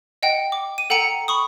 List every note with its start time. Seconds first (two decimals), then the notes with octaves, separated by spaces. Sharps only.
0.23 D#5 F#5 G5
0.52 D6
0.78 D#7
0.90 A4 F#5 G5 A#5 C#7 D#7
1.28 B5 C#6 D#6